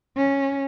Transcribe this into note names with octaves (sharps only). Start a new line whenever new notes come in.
C#4